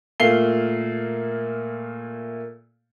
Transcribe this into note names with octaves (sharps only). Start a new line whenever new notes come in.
A#2 A3 A#3 F5 C7 G7